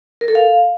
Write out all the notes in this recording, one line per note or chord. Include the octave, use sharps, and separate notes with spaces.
A#4
A4
F5